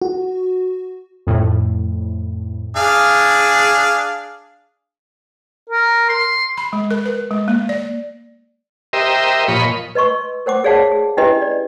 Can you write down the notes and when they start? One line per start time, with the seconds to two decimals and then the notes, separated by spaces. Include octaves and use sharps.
0.02 F#4
1.27 F2 A2
2.76 D4 G#4 F5
5.70 A#4
6.09 C6
6.57 B5
6.73 G#3
6.91 A#4
7.06 B4
7.31 G#3
7.48 A#3
7.69 D5
8.93 G4 A#4 C5 D#5 E5
9.48 A#2 F3 C#5 D#5 B5
9.95 B4 D#5 C6 C#6 E6
10.46 A#4 C5 F#5 D6
10.64 G#4 C#5 D5 F5 F#5 A5
10.92 G#4
11.17 C#4 D4 E4 G4 B4 D#5
11.42 D5